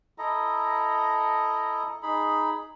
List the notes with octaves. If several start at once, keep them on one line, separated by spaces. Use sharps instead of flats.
E4 A4 D#5 A#5
D#4 G#4 B5